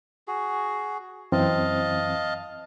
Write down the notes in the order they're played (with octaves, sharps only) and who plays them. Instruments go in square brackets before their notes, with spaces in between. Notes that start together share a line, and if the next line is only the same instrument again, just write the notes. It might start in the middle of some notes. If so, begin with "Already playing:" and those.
[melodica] F#4 G#4
[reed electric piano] F#2 E3 C4 [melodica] D#5 F5 A5